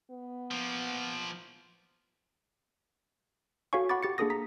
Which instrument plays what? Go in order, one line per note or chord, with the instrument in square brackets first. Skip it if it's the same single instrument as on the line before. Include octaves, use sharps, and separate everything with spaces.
[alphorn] B3
[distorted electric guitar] F3 A#3
[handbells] F#4 A4 C#5 F5 G#5 C#6
F#5 B5 C#6 D6 A6
G4 A6 C#7
A#3 D4 G#4 A4 D#6 A#6
A#5 B6